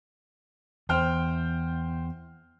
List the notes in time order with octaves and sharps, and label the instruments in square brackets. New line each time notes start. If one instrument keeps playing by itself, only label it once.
[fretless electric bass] E2 [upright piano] C5 G5 F6